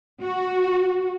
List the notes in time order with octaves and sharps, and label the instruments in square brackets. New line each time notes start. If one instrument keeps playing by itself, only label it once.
[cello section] F#4